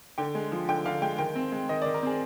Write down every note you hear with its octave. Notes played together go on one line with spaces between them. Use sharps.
D3 G5
G#3
F3
D3 G5
D3 F5
G#3 G5
D#3 G5
C4
G#3
D#3 D#5
D5
D#3
A#4
C4 G#4